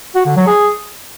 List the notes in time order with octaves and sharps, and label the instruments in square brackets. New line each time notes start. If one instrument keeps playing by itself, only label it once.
[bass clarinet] F#4
D3
F#3
G#4